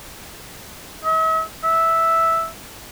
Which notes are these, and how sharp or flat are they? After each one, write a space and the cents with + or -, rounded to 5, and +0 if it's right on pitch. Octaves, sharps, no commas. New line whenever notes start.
E5 -45
E5 -5